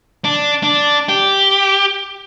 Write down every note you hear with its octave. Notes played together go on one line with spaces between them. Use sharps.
D4
D4
G4